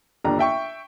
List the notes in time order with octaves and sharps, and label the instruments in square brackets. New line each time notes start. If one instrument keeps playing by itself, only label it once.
[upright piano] G1 D#2 D4 A#5
E5 G5 C#6